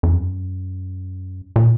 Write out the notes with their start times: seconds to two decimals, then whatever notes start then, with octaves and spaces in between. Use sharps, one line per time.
0.03 F2
0.14 F#2
1.56 A#2